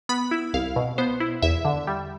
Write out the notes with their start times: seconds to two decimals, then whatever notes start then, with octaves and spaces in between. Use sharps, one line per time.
0.09 B3 B5
0.31 E4
0.54 C2 F5
0.76 B2
0.98 B3 C5
1.20 E4
1.42 E2 E5
1.65 D3
1.87 G3